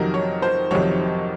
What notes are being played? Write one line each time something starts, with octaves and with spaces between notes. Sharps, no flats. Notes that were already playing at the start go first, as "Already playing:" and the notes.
Already playing: F2 C3 D#3 F#3 A#4
C#5
C5
F2 C3 D#3 F#3 C#5